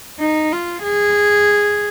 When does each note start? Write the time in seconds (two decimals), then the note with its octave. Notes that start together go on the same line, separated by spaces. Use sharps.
0.20 D#4
0.52 F4
0.83 G#4